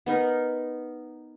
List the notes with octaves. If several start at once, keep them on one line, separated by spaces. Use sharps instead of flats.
B3 D#4 A#4 B4